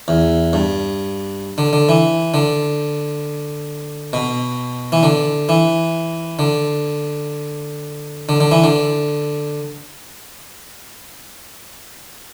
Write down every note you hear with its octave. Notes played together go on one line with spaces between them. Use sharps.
E2
G2
D3
D3
E3
D3
B2
E3
D3
E3
D3
D3
D3
E3
D3